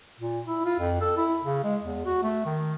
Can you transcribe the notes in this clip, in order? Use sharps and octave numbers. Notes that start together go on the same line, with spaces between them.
A#2
E4
F4
F2
A4
E4
C#3
G#3
E2
F#4
A3
D#3